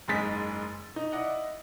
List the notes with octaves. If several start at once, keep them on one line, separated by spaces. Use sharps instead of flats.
F#1 G#2 G#3 G#4 A6 B6
D#4
E4 D5 D#5 F#5